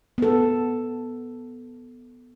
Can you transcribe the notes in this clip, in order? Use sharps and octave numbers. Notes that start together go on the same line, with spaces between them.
B3 A4